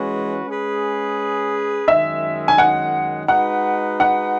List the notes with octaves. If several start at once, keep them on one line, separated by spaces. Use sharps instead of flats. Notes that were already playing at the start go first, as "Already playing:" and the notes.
Already playing: E3 G#3 C#4 F#4 B4
G#3 C#4 G#4 B4
F#2 D#3 G#3 E5
G#5
F#5
G#3 D#4 F#4 B4 F#5
F#5